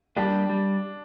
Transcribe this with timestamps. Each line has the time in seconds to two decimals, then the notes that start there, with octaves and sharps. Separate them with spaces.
0.16 G3 A#3 D4 G4
0.49 G3